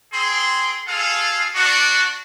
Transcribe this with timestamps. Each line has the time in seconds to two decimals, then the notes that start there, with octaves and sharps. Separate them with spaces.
0.13 C4 G#4 C6
0.86 F4 G#4 A4 F5
1.55 D4 F#4